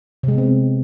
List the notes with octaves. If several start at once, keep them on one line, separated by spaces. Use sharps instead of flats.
C3 G#3 B3 C4